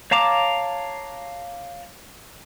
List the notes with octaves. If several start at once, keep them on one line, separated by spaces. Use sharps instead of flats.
C#5 F5 A5 A#5 D6